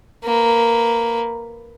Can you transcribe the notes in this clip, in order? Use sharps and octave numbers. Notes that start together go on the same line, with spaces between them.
A#3 B4